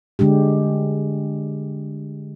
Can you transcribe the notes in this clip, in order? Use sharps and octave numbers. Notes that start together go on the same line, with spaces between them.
D3 G#3 D4 G4